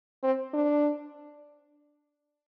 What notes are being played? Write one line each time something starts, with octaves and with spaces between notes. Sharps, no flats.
C4
D4